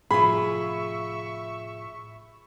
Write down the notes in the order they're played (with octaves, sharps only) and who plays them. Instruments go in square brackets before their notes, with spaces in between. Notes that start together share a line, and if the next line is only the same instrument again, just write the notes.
[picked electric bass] A2 C3 F3 [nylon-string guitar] F4 G#4 [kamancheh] E5 C#6 [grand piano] B5